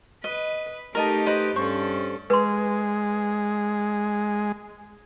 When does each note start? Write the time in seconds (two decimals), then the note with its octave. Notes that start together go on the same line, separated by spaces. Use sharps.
0.24 B4 D#5
0.95 A3 D#4 G4 A#4 D#5 A5
1.26 B4 C5 D#5
1.56 G2 C#4 A4 C5 C#6
2.30 G#3 B4 C6